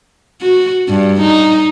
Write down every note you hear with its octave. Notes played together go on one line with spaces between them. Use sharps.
F#4
G2
D#4